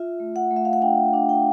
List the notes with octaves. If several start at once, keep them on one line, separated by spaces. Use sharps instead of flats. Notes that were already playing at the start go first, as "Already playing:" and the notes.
Already playing: F4 E5
A3
F#5
A3
E5
F5
F#5
D4 G5
D4
G5